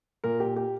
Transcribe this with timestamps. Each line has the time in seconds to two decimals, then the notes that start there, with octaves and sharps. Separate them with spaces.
0.24 A#2 A#4
0.40 A#2 G4
0.56 G4